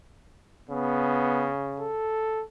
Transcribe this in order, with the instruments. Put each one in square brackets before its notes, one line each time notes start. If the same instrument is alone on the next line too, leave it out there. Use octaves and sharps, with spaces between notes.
[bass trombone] C#3 [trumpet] B3
[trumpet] A4